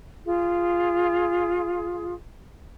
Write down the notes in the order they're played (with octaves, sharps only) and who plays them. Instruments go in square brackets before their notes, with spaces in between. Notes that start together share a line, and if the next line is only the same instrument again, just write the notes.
[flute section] F4 G#4